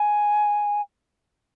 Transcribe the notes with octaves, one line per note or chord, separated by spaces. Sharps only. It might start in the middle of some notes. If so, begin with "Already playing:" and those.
Already playing: G#5